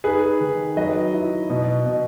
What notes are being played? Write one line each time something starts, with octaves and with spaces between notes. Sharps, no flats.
D#4 G#4 B4
D#3
F#3 B4 D#5
E4
B2
B2